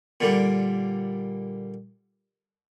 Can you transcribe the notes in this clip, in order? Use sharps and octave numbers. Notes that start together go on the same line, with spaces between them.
A#2 D3 G3